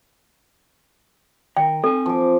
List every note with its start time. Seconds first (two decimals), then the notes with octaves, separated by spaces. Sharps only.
1.57 D#3 A#4 G5
1.84 C4 A4 G#5
2.06 F3 D6